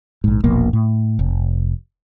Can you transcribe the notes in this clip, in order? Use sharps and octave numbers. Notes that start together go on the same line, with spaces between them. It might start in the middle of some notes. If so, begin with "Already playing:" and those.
A#1 G#2
E1 A#1 B2 A#3
A2
F1